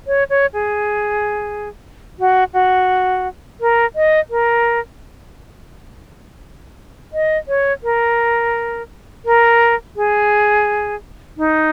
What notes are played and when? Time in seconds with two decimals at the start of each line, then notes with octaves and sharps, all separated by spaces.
0.07 C#5
0.30 C#5
0.53 G#4
2.19 F#4
2.54 F#4
3.61 A#4
3.95 D#5
4.30 A#4
7.13 D#5
7.48 C#5
7.83 A#4
9.25 A#4
9.96 G#4
11.37 D#4